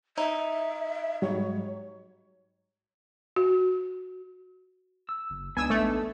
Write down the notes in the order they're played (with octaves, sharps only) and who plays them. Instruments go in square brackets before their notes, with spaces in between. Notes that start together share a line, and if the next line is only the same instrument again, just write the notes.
[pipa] D#4 [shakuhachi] E5
[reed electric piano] G#2 F#3 G3 [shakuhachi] C#5
[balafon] F#4
[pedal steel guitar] E6
[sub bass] F#1
[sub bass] C#2 [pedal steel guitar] B3 D4 D#4 [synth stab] G#5 E6
[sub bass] A1 [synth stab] A3